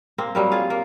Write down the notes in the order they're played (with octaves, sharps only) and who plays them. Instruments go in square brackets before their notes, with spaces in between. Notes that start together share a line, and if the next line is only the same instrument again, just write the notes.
[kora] A#3 C4
F#3 G3 A#3
F4 G#4 F5
A#3